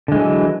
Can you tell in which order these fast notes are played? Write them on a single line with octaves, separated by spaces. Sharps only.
D3 G#3 E3 F#3